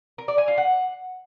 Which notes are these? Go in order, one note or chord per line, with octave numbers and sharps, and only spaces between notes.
A#4
D5
G#5
F4
F#5